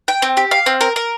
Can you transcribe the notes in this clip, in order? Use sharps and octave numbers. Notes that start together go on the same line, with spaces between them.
G5
C4
G4
F5
C4
A#4
A#4